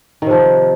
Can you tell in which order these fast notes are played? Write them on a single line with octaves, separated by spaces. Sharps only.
D#3 C3 F3